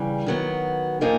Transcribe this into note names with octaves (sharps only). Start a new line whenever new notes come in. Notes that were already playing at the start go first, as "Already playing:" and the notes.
Already playing: C#3 E3 G3
D#3 F#3 B3
A#2 F3 A#3 D#4